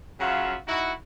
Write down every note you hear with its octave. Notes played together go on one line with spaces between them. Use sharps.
C#3 F#3 F4 F#4 E5 F5
D#4 E4 F#4